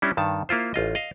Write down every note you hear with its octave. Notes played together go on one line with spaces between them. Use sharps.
G3 C#4 D4 E4
G2 D#3 A5
A#3 E4 F4 C5
A1 F4 D#5
D#5 F5